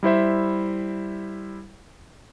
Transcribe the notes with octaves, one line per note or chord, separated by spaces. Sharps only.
G3 E4 C5 E5